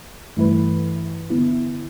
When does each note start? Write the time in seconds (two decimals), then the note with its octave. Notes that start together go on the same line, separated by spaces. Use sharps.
0.37 G2 E3 A3 E4 B4
1.30 D3 B3 E4